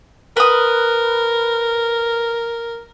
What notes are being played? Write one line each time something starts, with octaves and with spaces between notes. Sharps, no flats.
A#4 B4 D#6